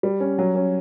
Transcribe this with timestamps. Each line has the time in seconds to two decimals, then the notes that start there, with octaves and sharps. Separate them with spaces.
0.03 G3
0.20 C#4
0.39 F#3
0.55 C#4